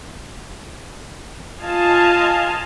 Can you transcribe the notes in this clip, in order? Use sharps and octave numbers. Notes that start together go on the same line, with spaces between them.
F4 D#5 F5 G#5 A5